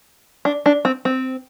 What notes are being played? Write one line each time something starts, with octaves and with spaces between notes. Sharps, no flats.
D4
D4
C4
C4